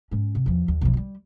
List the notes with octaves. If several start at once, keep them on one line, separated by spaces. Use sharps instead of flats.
G#2 C#4
C3
E2 F3
D#2
B1 F3
F3 G3